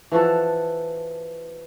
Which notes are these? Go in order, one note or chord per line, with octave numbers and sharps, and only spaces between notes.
E3 F3 F#4 A4